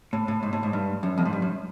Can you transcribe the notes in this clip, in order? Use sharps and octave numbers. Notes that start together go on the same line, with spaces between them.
A2
A2
G#2
A2
G#2
G2
F#2
F2
G#2
G2
F#2